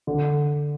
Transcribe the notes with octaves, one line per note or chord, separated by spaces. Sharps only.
D3